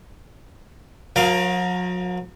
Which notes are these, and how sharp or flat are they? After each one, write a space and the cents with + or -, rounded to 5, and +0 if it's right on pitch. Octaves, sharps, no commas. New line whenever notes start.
F#3 -40 A#4 +20 F5 +0